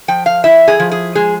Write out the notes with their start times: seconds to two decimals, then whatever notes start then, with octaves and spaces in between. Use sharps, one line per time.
0.08 F3 G5
0.26 F5
0.44 E4 E5
0.68 G#4
0.80 F3
0.92 G#4
1.15 G#3 G#4